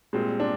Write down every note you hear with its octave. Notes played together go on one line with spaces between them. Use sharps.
A#2 G3 G#3 C4
D4